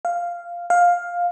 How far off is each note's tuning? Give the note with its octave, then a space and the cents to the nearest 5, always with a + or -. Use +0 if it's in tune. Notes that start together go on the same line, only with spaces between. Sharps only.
F5 -5
F5 +10